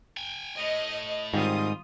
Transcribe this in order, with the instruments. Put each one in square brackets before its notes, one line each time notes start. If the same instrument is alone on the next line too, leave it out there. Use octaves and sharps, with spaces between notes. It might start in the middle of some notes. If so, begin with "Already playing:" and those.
[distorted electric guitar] G5 G#5
[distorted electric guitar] A2 [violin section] D#5
[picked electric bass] G#2 [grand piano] D#3 G3 C4 [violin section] F4 D#6